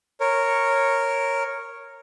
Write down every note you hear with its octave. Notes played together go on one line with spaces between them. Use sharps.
A#4 C#5